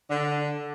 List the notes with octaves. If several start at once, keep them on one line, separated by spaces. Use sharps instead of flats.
D3